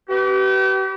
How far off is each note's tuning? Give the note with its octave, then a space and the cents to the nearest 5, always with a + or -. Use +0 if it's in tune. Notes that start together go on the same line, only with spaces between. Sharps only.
G4 -40 B4 +0